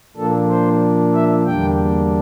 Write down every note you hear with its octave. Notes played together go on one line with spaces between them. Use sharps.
A#2 F3 A#3 D4 A4
C5
E5
E2 D3 G3 A#3 D4 G5